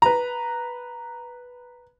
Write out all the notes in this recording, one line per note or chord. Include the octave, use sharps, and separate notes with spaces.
B4 A#5